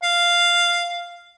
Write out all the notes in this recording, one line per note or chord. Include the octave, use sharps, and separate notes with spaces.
F5